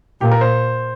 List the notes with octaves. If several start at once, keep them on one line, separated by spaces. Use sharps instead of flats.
A#2 G4
A#4
C5